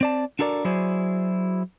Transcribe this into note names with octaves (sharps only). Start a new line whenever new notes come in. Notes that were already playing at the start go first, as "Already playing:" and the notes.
C4 D5 A5
D4 F#4 A4 A#4 D5
F#3 E4 F#4 G#4 C5 D5